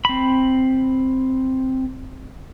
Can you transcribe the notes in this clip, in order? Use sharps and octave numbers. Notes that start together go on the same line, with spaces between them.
C4 B5